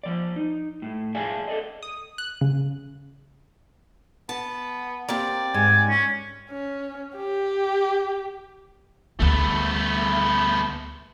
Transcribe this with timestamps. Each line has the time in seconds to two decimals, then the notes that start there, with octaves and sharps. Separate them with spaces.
0.03 F3 D5
0.36 D#4
0.82 A2
1.15 G#4 D5 E5 F5 G#5 A5
1.48 A4 D5 D#5
1.83 D#6
2.18 F#6
2.41 C#3
4.29 B3 A5
5.09 A#3 C4 G4 D5
5.54 G#2 G#5
5.89 C#4
6.51 C#4
7.17 G4
9.20 D2 G3 A3 B3